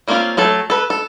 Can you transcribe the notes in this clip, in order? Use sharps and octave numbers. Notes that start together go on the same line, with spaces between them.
G3 A#3 C4 C#4 F4
F#3 A3 A4
A4 B4
A4